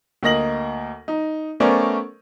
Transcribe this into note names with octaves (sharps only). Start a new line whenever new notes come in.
D2 A#3 D#5 A#6 F#7
D#4
A3 B3 C#4 A#4 C5 D5